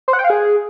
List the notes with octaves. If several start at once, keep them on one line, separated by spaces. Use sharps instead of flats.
C5
F#5
G5
F5
G#4